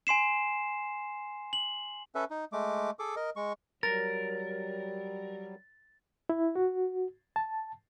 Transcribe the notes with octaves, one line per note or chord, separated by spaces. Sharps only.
G#5 C6 C7 E7
F#7
C#4 A4 B4 E5
D#4
G#3 A3 D6
G#4 A4 D6
A#4 D#5
G#3 C#6
F#3 G3 A#4 A6
E4
F#4
A5